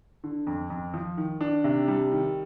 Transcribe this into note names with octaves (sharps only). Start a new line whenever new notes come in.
D3
F2
F2
F3
D#3
D4
C3
G3
D#3